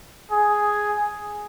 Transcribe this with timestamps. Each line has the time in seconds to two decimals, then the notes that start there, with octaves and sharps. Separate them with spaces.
0.32 G#4